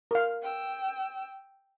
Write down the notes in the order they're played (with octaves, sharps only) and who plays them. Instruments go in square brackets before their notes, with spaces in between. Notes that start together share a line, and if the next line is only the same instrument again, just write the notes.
[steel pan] A#4 F5
[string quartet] G5 E6